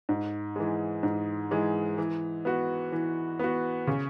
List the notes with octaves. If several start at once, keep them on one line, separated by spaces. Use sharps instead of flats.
G#2
E3 G#3
G#2
E3 G#3
E3
B3 F#4
E3
B3 F#4
C#3